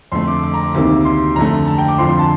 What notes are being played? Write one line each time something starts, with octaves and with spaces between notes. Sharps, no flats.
F2 D3 A3 C6
D6
D6
A#5
D6
D2 C3 D#3 A#3 D6
C6
F2 D3 A3 A#5
A5
G5
D6
F2 D3 F3 C6
C6
A5